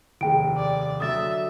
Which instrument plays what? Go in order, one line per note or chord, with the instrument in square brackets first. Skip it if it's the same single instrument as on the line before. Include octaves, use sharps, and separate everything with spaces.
[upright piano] F1 D#2 [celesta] G#4 G5 D7
[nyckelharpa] D5
[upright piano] D3 F#3 [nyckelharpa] E5 [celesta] D#6 A6